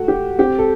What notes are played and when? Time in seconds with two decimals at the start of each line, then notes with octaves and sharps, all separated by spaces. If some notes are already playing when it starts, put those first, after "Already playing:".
Already playing: A3 F#4
0.08 G4
0.38 C4 G4
0.59 A4